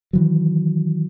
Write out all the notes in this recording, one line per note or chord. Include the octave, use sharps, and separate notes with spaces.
D#3 E3 F#3